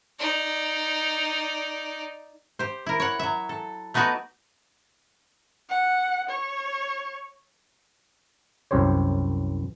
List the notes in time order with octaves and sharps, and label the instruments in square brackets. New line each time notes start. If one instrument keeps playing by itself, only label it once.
[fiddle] D#4 D5
[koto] G4 C5
E4 A#4
C#5 F#5
F#3 E5
A4
A3 B3 D#4 F#4 B4 D5
[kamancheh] F#5
C#5
[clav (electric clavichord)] C2 F#2 G4 C5 C#5